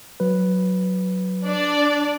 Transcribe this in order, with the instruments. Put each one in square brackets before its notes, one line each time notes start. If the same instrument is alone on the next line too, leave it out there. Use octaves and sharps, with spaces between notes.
[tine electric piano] F#3 B4
[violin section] D4 D5